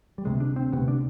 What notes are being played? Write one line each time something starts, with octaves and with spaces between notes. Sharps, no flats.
G3
D2 C3 G#3
D4
C4
D2 C3 B3
D4